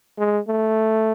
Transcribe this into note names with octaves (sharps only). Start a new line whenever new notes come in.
G#3
A3